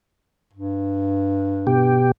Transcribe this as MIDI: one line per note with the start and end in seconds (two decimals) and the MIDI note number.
0.54 2.08 43
1.67 2.11 47
1.67 2.11 67